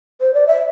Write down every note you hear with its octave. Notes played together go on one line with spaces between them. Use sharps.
C5
D5
E5